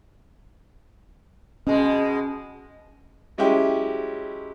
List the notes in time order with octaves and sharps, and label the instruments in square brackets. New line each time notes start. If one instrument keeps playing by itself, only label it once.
[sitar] B2 G#3 [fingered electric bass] C#4
[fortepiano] F#3 G#3 C#4 E4 G4